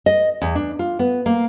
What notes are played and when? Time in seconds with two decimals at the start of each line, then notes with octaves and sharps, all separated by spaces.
0.06 D#5
0.42 E2
0.55 D4
0.79 F4
0.99 B3
1.26 A#3